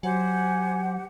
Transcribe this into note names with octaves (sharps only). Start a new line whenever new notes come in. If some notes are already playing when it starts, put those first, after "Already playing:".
F#3 G4 C5 F#5 G#5